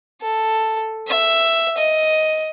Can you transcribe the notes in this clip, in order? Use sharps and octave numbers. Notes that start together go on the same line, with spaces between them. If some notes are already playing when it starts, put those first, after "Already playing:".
A4
E5
D#5